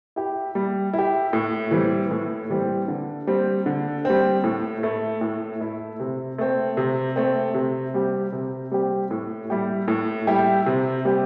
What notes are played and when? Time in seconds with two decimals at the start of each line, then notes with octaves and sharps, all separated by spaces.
0.16 E4 G4
0.55 G3
0.93 E4 G4
1.33 A2
1.71 E3 G3 C4
2.11 A2
2.50 E3 G3 C4
2.88 D3
3.27 G3 C4
3.66 D3
4.05 G3 C4
4.44 A2
4.83 A3 E4
5.21 A2
5.60 A3 E4
6.00 C3
6.38 A3 C4
6.77 C3
7.16 A3 C4
7.54 C3
7.94 G3 C4 G4
8.33 C3
8.71 G3 C4 G4
9.11 A2
9.50 G3 E4 G4
9.88 A2
10.27 G3 E4 G4
10.66 C3
11.05 G3 C4 G4